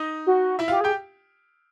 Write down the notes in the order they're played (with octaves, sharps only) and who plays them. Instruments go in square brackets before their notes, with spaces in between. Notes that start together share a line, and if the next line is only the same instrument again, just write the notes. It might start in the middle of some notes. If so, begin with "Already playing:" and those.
Already playing: [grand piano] D#4 D#5
[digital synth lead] F#4
[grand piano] E4 E5
[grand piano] F4 F5 [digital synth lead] G4
[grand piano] G4 G5 [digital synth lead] G#4